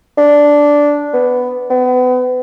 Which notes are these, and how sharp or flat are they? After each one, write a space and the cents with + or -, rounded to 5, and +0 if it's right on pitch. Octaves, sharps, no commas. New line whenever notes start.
D4 -5
B3 +10
B3 +35